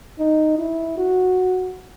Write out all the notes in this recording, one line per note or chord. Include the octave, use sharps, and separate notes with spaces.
D#4
E4
F#4